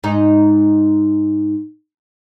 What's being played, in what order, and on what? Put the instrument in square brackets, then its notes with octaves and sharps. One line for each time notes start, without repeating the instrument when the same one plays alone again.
[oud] G#2 D#4